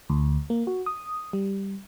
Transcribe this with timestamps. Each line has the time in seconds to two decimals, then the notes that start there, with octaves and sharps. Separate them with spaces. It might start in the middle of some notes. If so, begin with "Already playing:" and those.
0.10 D2
0.50 A#3
0.67 F#4
0.86 D#6
1.33 G3